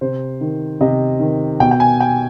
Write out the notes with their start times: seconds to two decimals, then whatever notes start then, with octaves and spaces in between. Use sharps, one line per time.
0.01 C3 C5
0.41 D#3
0.81 C3 D#5
1.20 D#3
1.60 B2 G5
1.71 G5
1.80 G#5
2.00 G5